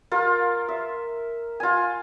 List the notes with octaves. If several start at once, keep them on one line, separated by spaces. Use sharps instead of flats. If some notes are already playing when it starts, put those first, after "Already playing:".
F4 A#4
E5
F4 G#5